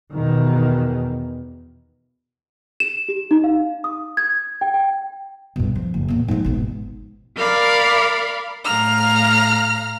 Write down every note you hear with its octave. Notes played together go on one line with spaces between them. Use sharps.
E2 B2 D#3
E7
G4
D#4
F5
D#6
G#6
G5
G5
G2 B2
F3
F#1
E2 A#2
G#2 F3
G#1 B2
A#4 D5 F5 B5
A2 F5 A#5 F6